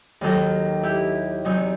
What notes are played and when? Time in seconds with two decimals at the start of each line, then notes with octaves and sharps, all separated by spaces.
0.21 D#2 D#3 F#3 F#4 A4
0.83 E4 G4
1.44 E2 C3 F#3 D#4 F#4